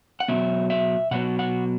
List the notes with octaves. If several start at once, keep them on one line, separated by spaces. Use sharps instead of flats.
F#5
B2 F#3 B3 E5
E5
B2 F#3 B3 F#5
F#5